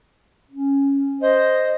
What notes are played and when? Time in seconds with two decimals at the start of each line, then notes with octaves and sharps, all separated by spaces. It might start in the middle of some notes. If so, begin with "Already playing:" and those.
0.51 C#4
1.21 C5 D#5